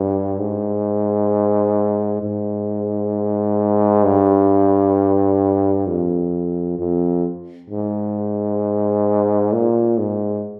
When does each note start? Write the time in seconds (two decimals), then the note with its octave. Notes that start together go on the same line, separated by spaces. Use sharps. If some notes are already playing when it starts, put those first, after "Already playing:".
Already playing: G2
0.39 G#2
2.22 G#2
4.05 G2
5.87 F2
6.78 F2
7.70 G#2
9.53 A#2
9.98 G#2